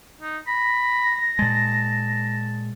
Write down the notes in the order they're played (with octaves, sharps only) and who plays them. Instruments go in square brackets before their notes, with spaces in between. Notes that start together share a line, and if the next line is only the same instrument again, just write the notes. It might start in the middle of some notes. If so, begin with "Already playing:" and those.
[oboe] D#4
[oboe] B5 [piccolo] A#6
[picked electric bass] A#2 G#3 [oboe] A5